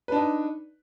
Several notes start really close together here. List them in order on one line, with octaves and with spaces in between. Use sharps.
B4 D4 D#4